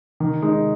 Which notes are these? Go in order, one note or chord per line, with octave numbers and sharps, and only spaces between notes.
D#3
G#3 D#4